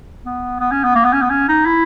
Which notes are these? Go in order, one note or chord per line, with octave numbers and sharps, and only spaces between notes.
B3
B3
C#4
B3
A#3
B3
C#4
B3
C#4
D#4
E4